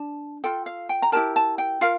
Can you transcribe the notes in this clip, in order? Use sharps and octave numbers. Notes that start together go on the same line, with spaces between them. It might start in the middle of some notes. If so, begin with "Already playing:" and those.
Already playing: D4 A5
F4 A4 G5
F5
G5
A#5
E4 G4 A#4 A5
A5
G5
F4 A#4 F5